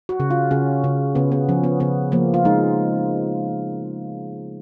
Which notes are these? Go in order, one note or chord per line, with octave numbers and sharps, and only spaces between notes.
F#4
C#3
F4
C#3 C#4
C#3
C#3 B3
B3
F3 C#4
B3
C#3 B3
F3 A#3
F4
G#3 D#4